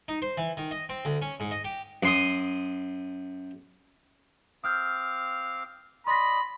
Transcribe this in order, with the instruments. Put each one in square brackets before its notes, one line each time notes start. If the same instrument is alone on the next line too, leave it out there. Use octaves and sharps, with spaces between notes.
[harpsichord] D#4
C5
E3
D#3
D#5
C4
D2
C#4
G#2
D#5
G4
F#2 C6 D#6
[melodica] C4 F5 D6 [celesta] D#6 F6 G6
[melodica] D5 D#5 [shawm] B5 [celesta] C6 A#6